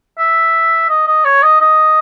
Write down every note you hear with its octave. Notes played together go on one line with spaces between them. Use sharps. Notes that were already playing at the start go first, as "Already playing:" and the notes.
E5
D#5
D#5
C#5
D#5
D#5